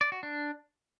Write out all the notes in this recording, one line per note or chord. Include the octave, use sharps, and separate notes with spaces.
D5
F#4
D4